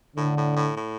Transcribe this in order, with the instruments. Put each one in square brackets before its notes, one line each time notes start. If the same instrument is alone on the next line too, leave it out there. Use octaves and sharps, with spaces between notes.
[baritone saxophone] A2 [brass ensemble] D3
[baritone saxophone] A2
A2
A2